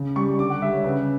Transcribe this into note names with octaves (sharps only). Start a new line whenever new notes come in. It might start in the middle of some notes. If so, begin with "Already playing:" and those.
Already playing: C#3
G3 C#6
D3 D6
F#5
G3 E5
C#5
C#3 B4